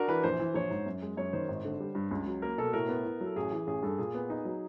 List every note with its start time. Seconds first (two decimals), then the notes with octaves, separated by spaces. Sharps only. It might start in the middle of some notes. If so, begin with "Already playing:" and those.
Already playing: D4 F#4 A#4
0.08 E3 B4
0.24 A#1 C5
0.40 E3
0.54 A#1 C#5
0.70 G#2
0.86 F#2
1.02 G#3
1.17 F#2 C#5
1.33 D#3 C5
1.48 G#1
1.65 D3
1.80 G3
1.95 G2
2.11 C#2
2.26 F#3
2.42 A#3 A#4
2.58 B2 A4
2.73 A2 A#4
2.89 B3
3.05 E4
3.21 F#3 A4
3.36 A1 G#4
3.52 E3
3.67 A1 G#4
3.83 G2 A4
3.98 A#2 G#4
4.14 B3
4.30 D#4
4.45 F#3